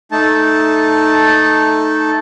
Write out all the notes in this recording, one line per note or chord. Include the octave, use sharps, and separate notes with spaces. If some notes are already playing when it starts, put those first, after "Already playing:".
A3 D#4 A5